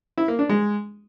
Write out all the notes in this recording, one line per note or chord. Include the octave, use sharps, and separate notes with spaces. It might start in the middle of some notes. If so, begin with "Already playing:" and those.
E4
A#3
D4
G#3